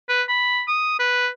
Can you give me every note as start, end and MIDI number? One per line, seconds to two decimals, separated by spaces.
0.09 0.23 71
0.29 0.62 83
0.68 0.95 87
0.99 1.28 71